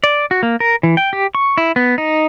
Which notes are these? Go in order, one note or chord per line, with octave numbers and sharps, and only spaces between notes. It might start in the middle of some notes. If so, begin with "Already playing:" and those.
D5
F#4
A#3
A#4
E3
G5
G4
C#6
E4
B3
D#4